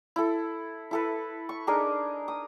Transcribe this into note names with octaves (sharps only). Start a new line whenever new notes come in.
E4 A4
E4 A4 B4
C#6
D4 D#4 G#4 A#4
D#6